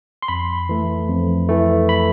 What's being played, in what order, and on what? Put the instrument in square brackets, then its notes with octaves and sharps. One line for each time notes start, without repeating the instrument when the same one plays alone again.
[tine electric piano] C6
F2 B5
E3 A3
F2
E3 A3
B5